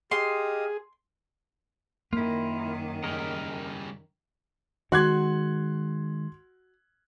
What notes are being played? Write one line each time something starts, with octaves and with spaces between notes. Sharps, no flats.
G4 G#4 D#5 F5 C6 D#6
F#2 D#3 A#3 E4 F4
C#3 G3 A#4 D#5
D#3 G#3 F#4 C6 F#6 G#6